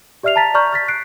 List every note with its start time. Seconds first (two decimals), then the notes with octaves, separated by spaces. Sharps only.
0.23 G4 D5 E5 F6 C7 F7
0.36 A5 A#5 A6 B6
0.54 D5 A#5 C#6 F6 G6
0.73 F6 A6 B6
0.88 F#6 C7 D7